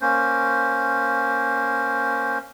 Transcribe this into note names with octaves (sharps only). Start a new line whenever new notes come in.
A#3 C#4 C5